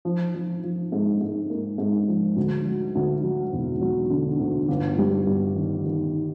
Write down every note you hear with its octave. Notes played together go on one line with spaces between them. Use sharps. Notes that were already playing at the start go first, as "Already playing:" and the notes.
F3
F3
F3
G#2
G#2
A#3
G#2
F3
D2
F#3
D2
F#3
E1
F#3
D3
D2
G1
G3
G2
D#3
D#3